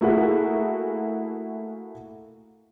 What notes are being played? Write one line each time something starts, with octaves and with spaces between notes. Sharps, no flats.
A3 A#3 E4 F#4 G#4